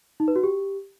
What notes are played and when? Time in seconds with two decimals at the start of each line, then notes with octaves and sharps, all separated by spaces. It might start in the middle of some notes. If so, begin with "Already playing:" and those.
0.20 D#4
0.28 B4
0.36 F#4
0.44 G4